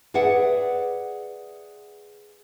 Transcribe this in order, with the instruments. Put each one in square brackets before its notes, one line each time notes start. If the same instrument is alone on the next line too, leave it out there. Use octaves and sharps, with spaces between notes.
[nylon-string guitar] G#4 B4 D5 E5 F#5